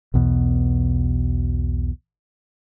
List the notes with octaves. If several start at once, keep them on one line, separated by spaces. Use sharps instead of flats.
B1 E2 B2